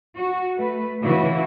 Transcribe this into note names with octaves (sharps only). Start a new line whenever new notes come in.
F#4
A3 B4
C#3 E3 E4 F#4